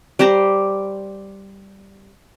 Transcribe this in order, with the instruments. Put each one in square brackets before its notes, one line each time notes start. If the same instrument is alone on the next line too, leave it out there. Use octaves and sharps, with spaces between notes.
[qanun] G3 G4 C5 A#5